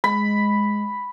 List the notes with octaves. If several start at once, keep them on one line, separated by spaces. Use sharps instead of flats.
G#3 B5